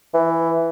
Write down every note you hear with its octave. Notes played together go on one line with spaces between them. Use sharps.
E3